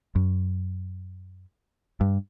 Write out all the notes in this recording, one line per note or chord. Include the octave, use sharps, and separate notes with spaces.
F#2
G2